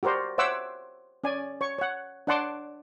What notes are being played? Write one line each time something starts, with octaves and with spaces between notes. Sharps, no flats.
F#4 G4 A#4 C5 D5
C5 C#5 E5 F#5 D6 E6
C#4 D5 G#5
C#5 C#6
C#5 F#5
D4 C#5 F#5 A5 C6 D6